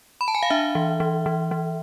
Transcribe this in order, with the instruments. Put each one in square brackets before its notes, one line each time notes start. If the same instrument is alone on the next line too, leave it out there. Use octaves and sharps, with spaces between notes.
[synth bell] B5
A5
G#5
F5
D4 E5
E3
E3
E3
E3